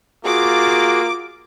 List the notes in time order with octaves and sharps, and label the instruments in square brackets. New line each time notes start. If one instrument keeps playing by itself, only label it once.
[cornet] A#3 [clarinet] F4 [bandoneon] F#4 G#4 [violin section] D6